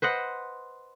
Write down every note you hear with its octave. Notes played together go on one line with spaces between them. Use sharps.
B4 C5 D#5 F#5